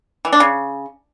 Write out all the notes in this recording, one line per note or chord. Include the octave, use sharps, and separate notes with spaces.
E3
D4
C#3